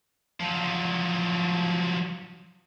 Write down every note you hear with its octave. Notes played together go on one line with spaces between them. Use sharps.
F3 F#3